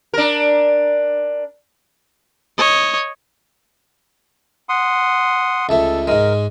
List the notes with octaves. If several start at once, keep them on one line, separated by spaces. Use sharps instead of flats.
D4 A#4
C#5 D#5
F#5 C6 D#6
C#2 A3 A4
G#2 G#3 A#4